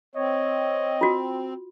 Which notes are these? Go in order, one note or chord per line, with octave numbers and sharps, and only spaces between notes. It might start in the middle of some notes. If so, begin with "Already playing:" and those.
C4 C#5 D#5
F4 F#4